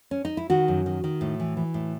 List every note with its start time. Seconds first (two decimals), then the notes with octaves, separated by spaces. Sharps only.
0.11 C#4
0.25 D#4
0.37 E4
0.50 D#3 F#4
0.68 F#2
0.86 D#3
1.04 D#3
1.21 A2
1.40 E3
1.57 E3
1.74 A2